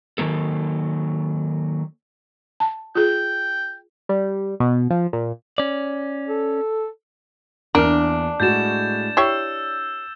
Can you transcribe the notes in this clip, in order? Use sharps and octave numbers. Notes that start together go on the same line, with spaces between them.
D#3 F#3 A#3 A4
A5
F4 G#4 G5
G3
B2
F3
A#2
C#4 D5
A4
E2 A#3 D4 F6
A2 G#3 F#4 G6 A6 E7
E4 G4 C#5 E6 C7